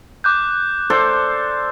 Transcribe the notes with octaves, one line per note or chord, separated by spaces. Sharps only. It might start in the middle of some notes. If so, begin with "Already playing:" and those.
D6 F#6 G6
A4 C5 D5